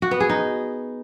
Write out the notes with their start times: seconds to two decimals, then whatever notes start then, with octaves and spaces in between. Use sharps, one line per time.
0.02 F#4
0.11 B3
0.20 G#4
0.29 D#4